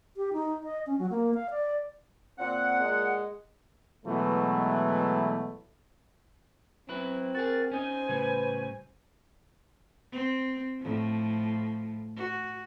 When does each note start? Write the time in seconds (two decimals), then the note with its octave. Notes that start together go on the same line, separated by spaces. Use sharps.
0.17 G4
0.33 D#4
0.64 D#5
0.87 C#4
0.99 F#3
1.10 A#3
1.34 F5
1.50 D5
2.39 A#2 C4 F#5
2.80 G#3
4.05 B2 E3 F#3 G#3 A3
6.89 F#3 C4 E4 B4
7.35 F#4 G#4 A#4 A6
7.71 C#4 D#4 C5 G#5
8.09 A2 C#3 G3 B4
10.12 C4
10.81 A2 F3
12.16 F#4